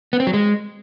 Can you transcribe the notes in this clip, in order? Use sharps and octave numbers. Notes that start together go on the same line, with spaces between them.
B3
C4
F#3
G#3